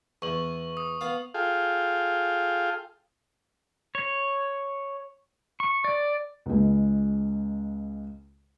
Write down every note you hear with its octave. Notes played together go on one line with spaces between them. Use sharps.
E2 C#6 F#7
D#6
B3 F5
F4 G#4 A4 F5 G5
C#5
C#6
D5
C#2 G#3